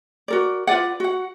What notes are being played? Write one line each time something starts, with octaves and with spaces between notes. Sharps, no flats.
F#4 A#4 D5
F4 B4 D5 F#5
F#4 F#5